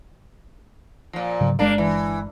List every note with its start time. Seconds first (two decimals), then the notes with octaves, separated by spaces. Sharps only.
1.13 A#2 F3
1.41 G#2 C#3 F#3
1.59 G1 G#3 A#3 D4
1.78 E3